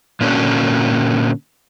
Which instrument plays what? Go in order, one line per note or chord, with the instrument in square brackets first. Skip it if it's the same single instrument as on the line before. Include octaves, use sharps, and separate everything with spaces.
[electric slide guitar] A#2 D3 A#3 C#4 D4 F#4